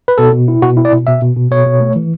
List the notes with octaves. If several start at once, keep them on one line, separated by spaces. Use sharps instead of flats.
B4
B2 A4
B2
E4
B2 F#4
E4
D5
B2
B2 E5
B2
B2
B2 C#5
B2
A3
E3